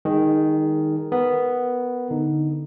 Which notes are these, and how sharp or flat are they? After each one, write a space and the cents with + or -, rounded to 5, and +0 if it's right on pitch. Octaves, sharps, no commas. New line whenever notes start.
D#3 +0 G#3 -35 G#4 +0
B3 +0 A#4 -10
D3 +0 D#4 +0